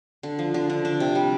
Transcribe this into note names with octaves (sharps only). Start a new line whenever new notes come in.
D3
F3
D3
D3
D4
C3
G3